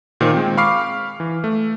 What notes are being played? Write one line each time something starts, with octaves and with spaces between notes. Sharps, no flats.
A#2 D#3 F4 C5
G#3 C4
F5 B5 C#6 D6 F6 C7
E3
A3